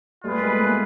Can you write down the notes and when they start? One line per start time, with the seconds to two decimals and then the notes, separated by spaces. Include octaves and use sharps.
0.24 G3 A3 F4 G#4 B4
0.42 G#3 A#3
0.59 A3 B3